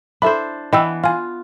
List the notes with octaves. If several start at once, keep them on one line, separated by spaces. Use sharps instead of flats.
D4 E4 A4 C5 E5 B5
E3 B3 D#5 G5 E6
F4 F5 G#5